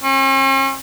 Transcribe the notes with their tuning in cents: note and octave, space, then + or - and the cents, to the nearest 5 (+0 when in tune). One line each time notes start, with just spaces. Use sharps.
C#4 -45